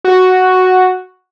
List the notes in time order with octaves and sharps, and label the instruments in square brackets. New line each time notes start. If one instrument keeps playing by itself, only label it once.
[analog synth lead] F#4